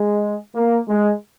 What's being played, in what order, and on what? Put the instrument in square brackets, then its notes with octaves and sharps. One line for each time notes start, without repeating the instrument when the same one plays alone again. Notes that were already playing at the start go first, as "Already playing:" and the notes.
Already playing: [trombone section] G#3
A#3
G#3